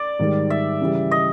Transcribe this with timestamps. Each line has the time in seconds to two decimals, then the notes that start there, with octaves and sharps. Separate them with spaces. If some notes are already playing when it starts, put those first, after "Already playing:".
Already playing: D5
0.19 G#2 D#3 G3
0.50 E5
0.81 C#3 E3 G3
1.11 D#5